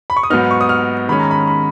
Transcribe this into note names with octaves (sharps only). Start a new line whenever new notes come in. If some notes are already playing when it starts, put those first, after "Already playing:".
B5
C#6
D#6
G#2 F#3 B3 D#4 F6
C#6
D#6
F6
D#3 G#3 C#4 B5
A#5
B5
B5